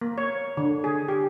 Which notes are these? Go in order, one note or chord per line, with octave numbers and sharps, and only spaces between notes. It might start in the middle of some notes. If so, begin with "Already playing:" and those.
A#3
C#5
D3
G#4
G4